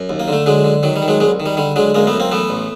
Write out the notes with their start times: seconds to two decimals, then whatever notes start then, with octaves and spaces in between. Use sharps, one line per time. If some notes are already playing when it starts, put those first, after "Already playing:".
Already playing: F#2
0.09 D#2
0.20 A#3
0.28 D3 A3
0.46 D3 F#3 G#3
0.64 D3
0.83 D#3 F#3
0.96 G3
1.02 D#3
1.08 F#3 G#3
1.20 C2 F#3 G#3
1.40 D#3
1.46 G3
1.57 D3 G3
1.76 D3 F#3 G#3
1.95 F#2 G#3 A#3
2.07 A3 B3
2.13 F#2
2.20 A#3 C4
2.31 E3 A3 B3
2.50 A1